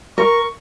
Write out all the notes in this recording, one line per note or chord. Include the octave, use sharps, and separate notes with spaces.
A#4 C#6